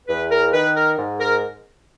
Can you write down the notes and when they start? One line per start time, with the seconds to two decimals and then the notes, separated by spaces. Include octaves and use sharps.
0.07 E2 B4
0.30 A#4
0.52 D#3 B4
0.75 A#4
0.97 G#2
1.20 A#4